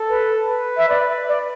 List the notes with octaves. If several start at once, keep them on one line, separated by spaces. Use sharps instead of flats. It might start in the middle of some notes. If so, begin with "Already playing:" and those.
Already playing: A4
B4
B4
E5
B4 D5
D5